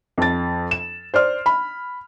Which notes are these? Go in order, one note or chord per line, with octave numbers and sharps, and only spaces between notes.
F2 A6
E7
C5 D5 F6
B5